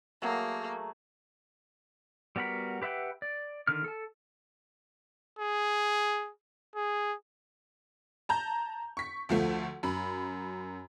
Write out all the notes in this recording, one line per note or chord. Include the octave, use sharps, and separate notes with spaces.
F#3 A3 A#3 G#4
G3 B3 F#4 A#4 B5
G4 B4 E5 F#5 G5
D5
D3 D#3 F6
A4 A5
G#4
G#4
A5 A#5 G6
C#6 B6
D2 F3 A3
F#2 B5